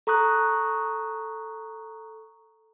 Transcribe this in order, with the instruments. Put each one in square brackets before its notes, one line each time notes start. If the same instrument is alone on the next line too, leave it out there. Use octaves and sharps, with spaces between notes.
[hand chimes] A4 A#5 C#6 D#6 F#6